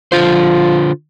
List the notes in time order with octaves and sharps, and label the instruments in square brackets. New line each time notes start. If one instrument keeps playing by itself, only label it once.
[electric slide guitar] D3 F4 C5 [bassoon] F3